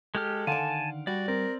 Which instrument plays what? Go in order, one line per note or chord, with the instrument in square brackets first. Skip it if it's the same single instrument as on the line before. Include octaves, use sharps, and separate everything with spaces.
[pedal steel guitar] G#3 G4 F6 [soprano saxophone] A4
[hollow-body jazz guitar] D3 D#3 D5 [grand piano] F5 F#5 C6 [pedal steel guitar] G#5 A5
[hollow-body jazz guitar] G3 [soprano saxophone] F#4 [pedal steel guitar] D5
[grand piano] C4 [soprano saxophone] A#4